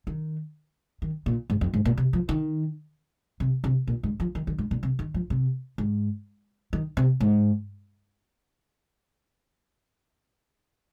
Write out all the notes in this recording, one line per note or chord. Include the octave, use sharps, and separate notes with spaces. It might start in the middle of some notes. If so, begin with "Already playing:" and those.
D#3
D#3
A#2
G#2
F2
G#2
A#2
C3
F3
D#3
C3
C3
A#2
G#2
F3
D#3
D#3
G#2
A#2
C3
D#3
F3
C3
G#2
D#3
C3
G#2